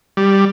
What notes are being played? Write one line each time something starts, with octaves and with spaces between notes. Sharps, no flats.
G3